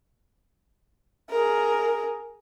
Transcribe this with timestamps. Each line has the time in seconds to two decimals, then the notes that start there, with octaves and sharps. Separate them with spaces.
1.30 G#4 A#4